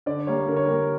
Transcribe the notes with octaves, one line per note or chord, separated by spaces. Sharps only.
D3 D5
G3 A#3 C#5
D3 A#4
C#5
G3 A#3 A#4